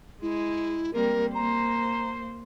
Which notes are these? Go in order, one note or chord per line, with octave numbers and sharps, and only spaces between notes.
G#3 E4
G3 A#3 C4 A#4
A#3 C5 A#5